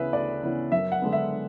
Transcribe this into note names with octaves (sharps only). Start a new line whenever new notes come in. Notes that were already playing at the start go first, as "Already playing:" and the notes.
Already playing: D2 C#3 E3 B3 G#4 B4 E5
D2 D5
C#3 E3 B3
F#2 E5
F#5
D3 G#3 B3
E5